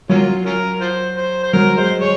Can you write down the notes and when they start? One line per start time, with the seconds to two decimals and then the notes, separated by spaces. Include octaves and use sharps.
0.09 F#3 A#3 C#4 F4
0.46 C#4 F4 A#4
0.81 F4 C5
1.17 C5
1.43 C5
1.53 F#3 A#4
1.77 G#3 C5
2.01 G#3 C#5